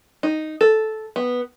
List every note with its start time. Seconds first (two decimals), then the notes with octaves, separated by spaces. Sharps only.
0.23 D#4
0.61 A4
1.16 B3